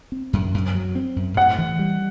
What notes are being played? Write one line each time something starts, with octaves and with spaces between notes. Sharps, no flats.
C4
F#2
F#2
F#3
C4
F#2
A2 F#5
E3
G3